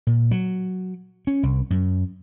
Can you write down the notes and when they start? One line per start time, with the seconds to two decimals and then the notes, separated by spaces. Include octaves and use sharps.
0.07 A#2
0.31 F#3
1.27 C#4
1.43 C2
1.70 F#2